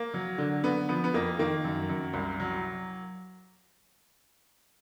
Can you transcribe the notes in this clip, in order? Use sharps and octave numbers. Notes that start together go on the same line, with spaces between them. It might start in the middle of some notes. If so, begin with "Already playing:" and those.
Already playing: A#3
F#3
D3
D3 B3
F3 B3
B3
F2 A#3
D#3 A#3
F#2
F#2
C2
F#3